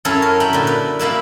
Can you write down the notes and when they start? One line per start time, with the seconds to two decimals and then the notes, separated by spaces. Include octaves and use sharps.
0.05 F#2 C#4 E4 A4 C#5
0.22 A#4
0.40 C#4 E4 G5 B5
0.53 A#2 D3
0.67 B4
0.99 G3 A#3 E4 E5